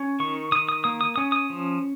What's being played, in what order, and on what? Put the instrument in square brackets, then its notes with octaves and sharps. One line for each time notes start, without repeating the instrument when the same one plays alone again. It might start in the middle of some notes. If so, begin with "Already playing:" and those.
Already playing: [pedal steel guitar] C#4
D#3 C#6
D#3 D#6
D#6
A#3 D#6
D#6
C#4 D#6
D#6
F3